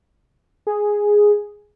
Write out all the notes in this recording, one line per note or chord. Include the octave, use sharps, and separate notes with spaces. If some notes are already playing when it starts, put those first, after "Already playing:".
G#4